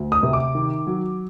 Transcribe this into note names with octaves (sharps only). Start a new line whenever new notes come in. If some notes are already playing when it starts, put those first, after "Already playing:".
Already playing: D2
D#6
C3
D6
D#3
F#3